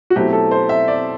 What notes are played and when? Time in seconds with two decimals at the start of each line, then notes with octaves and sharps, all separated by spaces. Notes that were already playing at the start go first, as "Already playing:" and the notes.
0.10 F#4
0.16 B2 F#3 A3 C4 E4 G4
0.33 A4
0.51 C5
0.69 E5
0.88 D5